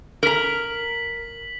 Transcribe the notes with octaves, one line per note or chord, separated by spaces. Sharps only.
A#4 A#5 B6 F#7